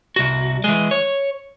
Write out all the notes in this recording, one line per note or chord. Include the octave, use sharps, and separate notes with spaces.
C2 F#4
E3 G#3
C#5